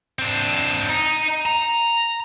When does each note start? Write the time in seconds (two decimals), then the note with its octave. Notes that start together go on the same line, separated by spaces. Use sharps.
0.19 C4 D4
0.89 D#4
1.46 A#5